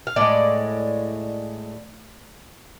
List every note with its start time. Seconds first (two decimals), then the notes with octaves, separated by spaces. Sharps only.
0.07 F5
0.16 A2 G#3 D5